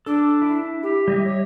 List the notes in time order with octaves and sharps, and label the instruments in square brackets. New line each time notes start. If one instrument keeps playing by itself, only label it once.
[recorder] D4 [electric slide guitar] A4
[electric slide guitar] E4
[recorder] G4
[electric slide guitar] G3 D#5 E5
[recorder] C#5